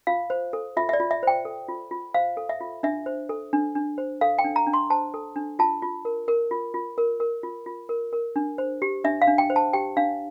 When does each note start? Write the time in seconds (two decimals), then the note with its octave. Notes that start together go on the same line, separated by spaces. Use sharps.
0.07 F4 F5
0.30 C5
0.53 A4
0.77 F4 E5
0.89 E5
0.93 D5
1.00 F4
1.11 E5
1.23 C5 G5
1.45 A4
1.68 F4
1.91 F4
2.14 C5 F5
2.37 A4
2.49 E5
2.61 F4
2.83 D4 E5
3.06 C5
3.29 A4
3.53 D4
3.75 D4
3.98 C5
4.21 A4 F5
4.39 G5
4.44 D4
4.56 A#5
4.67 D4
4.73 C6
4.90 C5 A5
5.14 A4
5.36 D4
5.59 F4 A5
5.82 F4
6.05 A#4
6.28 A#4
6.51 F4
6.74 F4
6.98 A#4
7.20 A#4
7.43 F4
7.66 F4
7.89 A#4
8.13 A#4
8.36 D4
8.58 C5
8.82 G4
9.04 D4 E5
9.22 F5
9.27 D4
9.38 G5
9.50 C5
9.56 A5
9.73 G4 G5
9.97 D4 F5